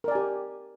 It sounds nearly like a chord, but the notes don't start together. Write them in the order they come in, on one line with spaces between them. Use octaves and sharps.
A#4 D5 G#5 G4